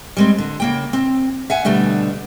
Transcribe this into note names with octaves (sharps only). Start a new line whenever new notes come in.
G3 G#3 C4
D3
C#3 A#3 G5
C4
E5 F#5 G#5
B2 D3 G3 A3 D4